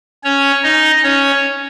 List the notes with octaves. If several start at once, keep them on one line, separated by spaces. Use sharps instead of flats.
C#4 C#5
D#4 D#5
C#4 C#5